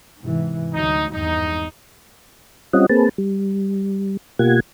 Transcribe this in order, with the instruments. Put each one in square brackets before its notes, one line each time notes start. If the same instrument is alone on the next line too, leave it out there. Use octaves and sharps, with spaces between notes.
[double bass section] G#2 C3 E3
[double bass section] D2 F#3 [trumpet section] D#4
[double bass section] G#1 E2 G2 [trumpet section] D#4
[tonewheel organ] G3 C4 C#4 F4 D#5 F#5
A#3 C4 G#4 B4 A5
G3
B2 A#3 F4 G4 F#5 G#6